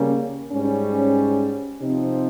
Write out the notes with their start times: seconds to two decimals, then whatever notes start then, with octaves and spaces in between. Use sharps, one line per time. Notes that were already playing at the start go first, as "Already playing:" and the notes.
Already playing: C#3 G3 A#3 C#4
0.52 G#2 G3 C#4
1.81 C3 F3 C4 D#4